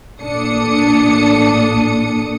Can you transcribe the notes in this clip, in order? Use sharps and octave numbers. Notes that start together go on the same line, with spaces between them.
A1 A#2 D4 A4 D#6 C#7